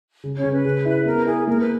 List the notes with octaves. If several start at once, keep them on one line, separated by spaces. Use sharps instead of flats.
C#3
C#4 C#5
C#3
B4
C#3
E4
B3 A#4
E4 G#4
A#3 A#4
B4